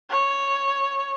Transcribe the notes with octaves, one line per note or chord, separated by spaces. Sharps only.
C#5